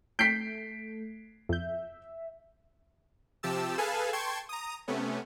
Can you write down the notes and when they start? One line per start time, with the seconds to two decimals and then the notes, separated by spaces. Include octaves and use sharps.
0.19 A3 G6 B6 C7 D7
1.49 F2 E5 G6
3.43 C3 F3 G4 A5 E6
3.78 G#4 A4 B4 F5 G#5 A5
4.13 G5 A5 C6 C#6 G#6
4.49 A#5 D#6
4.88 C3 A3 B3 C#4